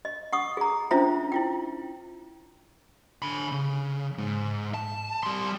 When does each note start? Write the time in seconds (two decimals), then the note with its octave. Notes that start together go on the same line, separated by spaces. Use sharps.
0.05 D#5
0.33 F#5 C#6 D#6
0.57 G#4 A#5
0.91 C#4 D4 F4 C5 E5 A#5
1.32 E4 F4 G5
3.22 D3 B5
3.51 C#3
4.18 G#2
4.74 A5
5.23 G3 C6